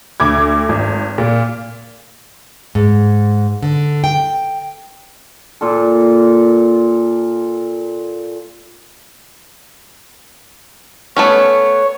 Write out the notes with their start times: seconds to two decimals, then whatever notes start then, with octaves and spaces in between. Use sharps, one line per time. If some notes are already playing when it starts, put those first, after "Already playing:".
0.20 D2 D6 G#6
0.69 G#1
1.18 A#2
2.75 G#2
3.63 D3
4.04 G5
5.61 A#2 F4 A4
11.17 A3 B3 C#4 C#5